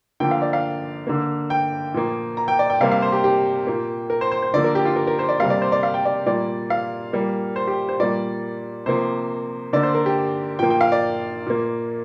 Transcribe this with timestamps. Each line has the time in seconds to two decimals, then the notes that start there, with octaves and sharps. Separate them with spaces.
0.20 D3 F3 A#3 G5
0.31 F5
0.42 D5
0.53 F5
1.07 D3 A#3
1.50 G5
1.94 A#2 F3 A#3
2.37 A#5
2.48 G5
2.59 D5
2.70 G5
2.80 C3 G3 A#3 F5
2.92 F5
3.02 C5
3.12 G4
3.24 G4
3.67 A#2 A#3
4.10 A#4
4.21 C5
4.32 C5
4.43 C5
4.53 D3 F3 A#3 D5
4.64 A#4
4.75 G4
4.85 F4
4.96 A#4
5.07 A#4
5.19 C5
5.29 D5
5.40 C3 G3 A#3 F5
5.50 D5
5.62 C5
5.72 D5
5.83 F5
5.94 G5
6.05 D5
6.26 A#2 G3 A#3 D5
6.70 F5
7.13 A#2 G3 A#3
7.56 C5
7.67 G4
7.89 C5
7.99 A#2 G3 A#3 D5
8.86 C3 F3 A#3 C5
9.73 D3 A#3 D5
9.83 C5
9.95 A#4
10.06 G4
10.59 A#2 F3 A#3 G5
10.70 G5
10.81 F5
10.92 D5
11.46 A#2 A#3